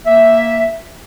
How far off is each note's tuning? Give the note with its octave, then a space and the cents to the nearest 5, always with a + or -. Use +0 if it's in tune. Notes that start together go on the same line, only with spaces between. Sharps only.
A#3 +0 E5 +0